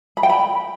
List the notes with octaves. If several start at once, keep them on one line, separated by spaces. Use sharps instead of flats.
B5
G5
B5